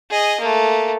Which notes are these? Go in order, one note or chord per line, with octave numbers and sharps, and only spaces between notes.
G#4 D#5
A3 A#3